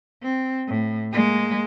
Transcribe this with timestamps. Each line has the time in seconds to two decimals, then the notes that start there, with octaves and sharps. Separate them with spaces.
0.23 C4
0.68 A2
1.12 G#3 A#3